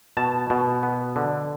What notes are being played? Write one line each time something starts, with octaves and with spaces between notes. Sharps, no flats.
B2 A5
B2
B3
D3